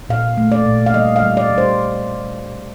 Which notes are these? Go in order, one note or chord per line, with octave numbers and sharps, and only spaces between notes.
A#2 F5
A3
D5
A#2
F5
G3 D#5
F5
G3
D5
G3
C5